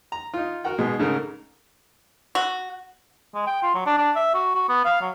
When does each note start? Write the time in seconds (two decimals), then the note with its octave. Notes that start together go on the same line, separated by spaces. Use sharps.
0.12 A#5
0.34 D#4 F4
0.64 F#4 A#4 F#5 G5
0.78 G#2 B2 G#3
0.99 G#2 C#3 A3 D#4 A#4
2.35 F#4
3.35 G#3
3.47 G5
3.63 F4
3.75 F#3
3.86 D4
3.98 D4
4.16 E5
4.34 F#4
4.55 F#4
4.69 B3
4.85 F5
5.01 F#3